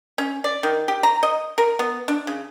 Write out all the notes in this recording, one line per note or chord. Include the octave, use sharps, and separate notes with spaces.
C#4
D5
D#3
G4
A#5
D#5
A#4
B3
D4
C#3